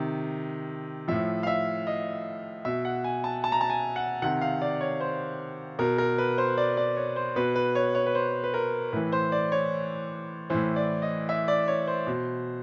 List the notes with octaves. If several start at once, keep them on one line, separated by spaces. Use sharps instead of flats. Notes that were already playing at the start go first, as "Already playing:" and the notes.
Already playing: C3 D#3
A2 F3 E5
F5
E5
D#5
B2 E5
F#5
G#5
A5
A5
A#5
A5
G#5
F#5
C3 D#3 F#5
F5
D5
C#5
C5
B2 A#4
A#4
B4
C5
D5
D5
C#5
C5
B2 B4
B4
C#5
C#5
B4
C5
B4
A#4
A2 E3 B4
C5
D5
C#5
A2 E3 C5
D5
D#5
E5
D5
C#5
C5
B2